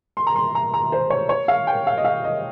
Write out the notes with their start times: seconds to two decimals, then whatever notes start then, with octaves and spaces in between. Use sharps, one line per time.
0.17 C6
0.27 A#5
0.36 C6
0.55 A#5
0.74 A#5
0.92 C5
1.10 C#5
1.29 C#5
1.48 F5
1.67 G5
1.87 F5
1.98 D#5
2.04 F5
2.24 D#5